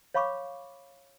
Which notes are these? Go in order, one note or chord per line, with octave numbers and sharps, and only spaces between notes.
C#5 F5 B5 C#6 D6